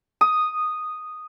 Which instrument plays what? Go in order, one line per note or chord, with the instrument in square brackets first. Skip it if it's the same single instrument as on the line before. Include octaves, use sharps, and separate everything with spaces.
[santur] D#6